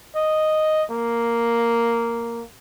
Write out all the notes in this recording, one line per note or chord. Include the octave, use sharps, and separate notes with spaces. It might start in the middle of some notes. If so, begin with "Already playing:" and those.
D#5
A#3